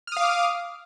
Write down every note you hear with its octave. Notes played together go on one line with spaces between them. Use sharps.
F5 D6 D#6 F6